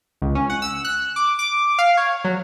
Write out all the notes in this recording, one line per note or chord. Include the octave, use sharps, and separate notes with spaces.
C#2
C#4
F#5
E6
F#6
D6
D6
F5
C#5
F#3